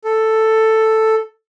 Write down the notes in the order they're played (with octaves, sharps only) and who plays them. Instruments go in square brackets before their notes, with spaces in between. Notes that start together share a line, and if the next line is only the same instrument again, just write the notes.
[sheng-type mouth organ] A4